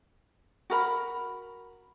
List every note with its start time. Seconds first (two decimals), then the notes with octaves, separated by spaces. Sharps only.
0.70 F#4 A#4 B5